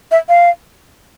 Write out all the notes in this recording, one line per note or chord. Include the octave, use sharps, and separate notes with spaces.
E5
F5